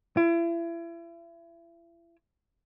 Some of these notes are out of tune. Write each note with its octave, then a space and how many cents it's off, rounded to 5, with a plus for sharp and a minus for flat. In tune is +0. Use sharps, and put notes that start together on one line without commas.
E4 +35